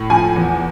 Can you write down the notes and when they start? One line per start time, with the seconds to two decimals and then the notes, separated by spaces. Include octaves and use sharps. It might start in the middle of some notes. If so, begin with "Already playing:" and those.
Already playing: A2
0.10 F3 G#5
0.36 E2